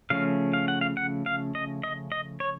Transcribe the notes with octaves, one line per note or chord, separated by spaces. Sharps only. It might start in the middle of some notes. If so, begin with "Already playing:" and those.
C#3 F3 A3 C#4 F5
F5
F#5
F5
F#5
F5
D#5
D#5
D#5
C#5